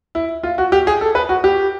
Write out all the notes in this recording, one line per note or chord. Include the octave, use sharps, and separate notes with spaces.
E4
F4
F#4
G4
G#4
A4
B4
F#4
G4